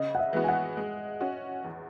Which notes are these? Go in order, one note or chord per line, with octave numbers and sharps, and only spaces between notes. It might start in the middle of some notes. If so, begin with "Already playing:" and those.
Already playing: C#3 D#5
F#5
E5
E3 G#3 B3 F#4
G#5
F#5
G#3
C#4 F#4
E2